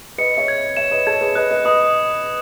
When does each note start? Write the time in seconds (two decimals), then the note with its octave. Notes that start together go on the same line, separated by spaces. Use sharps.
0.18 B4 D#5 C#7
0.37 C#5 E5
0.48 G#6
0.77 C#5 E5 E7
0.91 B4 D#5
1.07 A4 C#5 G#6
1.21 G#4 B4
1.35 B4 D#5 F#6
1.51 B4 D#5
1.65 B4 D#5 D#6